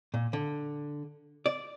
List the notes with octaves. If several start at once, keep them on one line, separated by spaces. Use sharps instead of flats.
A#2
D3
D5